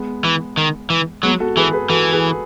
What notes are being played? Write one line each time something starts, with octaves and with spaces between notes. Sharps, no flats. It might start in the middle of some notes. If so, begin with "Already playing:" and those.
Already playing: G#3 B3
E3
D#3
E3
F#3 G#3 B3
F#4 A4
E3 G#4 B4
G#4 B4
E3 F#4 A4
G#4 B4